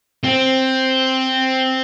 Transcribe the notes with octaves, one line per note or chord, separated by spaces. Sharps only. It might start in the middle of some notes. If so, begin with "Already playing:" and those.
C4